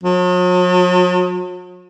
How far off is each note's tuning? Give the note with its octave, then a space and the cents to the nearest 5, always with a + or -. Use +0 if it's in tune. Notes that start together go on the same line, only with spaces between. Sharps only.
F#3 -45